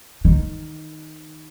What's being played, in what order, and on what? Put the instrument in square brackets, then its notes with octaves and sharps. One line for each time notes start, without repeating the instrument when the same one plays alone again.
[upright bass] D#3